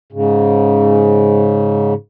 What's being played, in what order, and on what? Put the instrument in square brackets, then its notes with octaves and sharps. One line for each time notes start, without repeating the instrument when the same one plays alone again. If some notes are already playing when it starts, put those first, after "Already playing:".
[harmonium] G#2 C#3